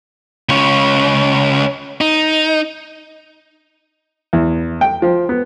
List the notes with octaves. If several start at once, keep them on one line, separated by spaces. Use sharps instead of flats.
C#2 C#4
D#4
E2
G5
F3
B3